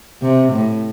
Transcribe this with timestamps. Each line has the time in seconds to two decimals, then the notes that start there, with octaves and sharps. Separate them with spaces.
0.22 C3
0.53 A2